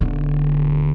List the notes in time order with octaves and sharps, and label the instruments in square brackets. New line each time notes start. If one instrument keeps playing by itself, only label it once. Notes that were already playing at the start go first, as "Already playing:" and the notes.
[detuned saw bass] D#1 [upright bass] D3 B3